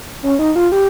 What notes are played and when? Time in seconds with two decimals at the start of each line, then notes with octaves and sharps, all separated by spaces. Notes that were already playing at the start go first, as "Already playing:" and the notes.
0.23 C#4
0.39 D#4
0.56 F4
0.72 G4